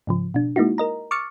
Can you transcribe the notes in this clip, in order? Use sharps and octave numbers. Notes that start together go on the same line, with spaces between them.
G#2 C#3 F3
B2 D4
G#3 A#3 D#4 E4 F#4
A#4 D#5 A#5
C#6 D6 E6 F6 A6 C#7